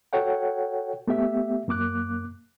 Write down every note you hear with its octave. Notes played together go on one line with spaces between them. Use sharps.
F#4 A4 C#5 F#5 G5
A3 B3 G4 E5
F#2 A#3 D6 F#6